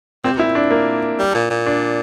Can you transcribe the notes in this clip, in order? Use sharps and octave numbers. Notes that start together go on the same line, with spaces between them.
A#2 C4
C3
A#2 E4
D4
A#3
G3
A#2
A#2
D4